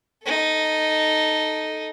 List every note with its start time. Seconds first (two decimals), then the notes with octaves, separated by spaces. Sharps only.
0.24 D#4 A4